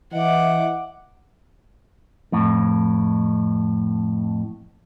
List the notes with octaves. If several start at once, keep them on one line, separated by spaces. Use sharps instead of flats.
E3 D#5 E5 F#5 D6
F2 A2